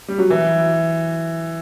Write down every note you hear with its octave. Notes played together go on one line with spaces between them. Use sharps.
G3
F#3
E3